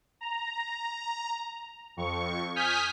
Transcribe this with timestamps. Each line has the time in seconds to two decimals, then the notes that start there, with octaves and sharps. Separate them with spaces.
0.21 A#5
1.97 F2 C#6
2.56 G#5 D#6 F6 G6 B6